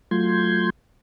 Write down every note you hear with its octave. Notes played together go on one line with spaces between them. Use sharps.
F#3 A3 F4 C6 G6 G#6